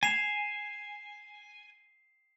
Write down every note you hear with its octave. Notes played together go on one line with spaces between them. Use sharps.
G#5 C7 E7 F7